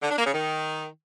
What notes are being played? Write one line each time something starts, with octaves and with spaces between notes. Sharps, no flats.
D3
D4
A#3
C#3
D#3